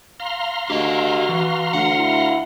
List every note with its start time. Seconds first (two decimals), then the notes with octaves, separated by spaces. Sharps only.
0.20 F5 A#5 C6
0.70 D2 F#4 G4 D#5
1.29 E3
1.73 D2 F#5
1.97 E4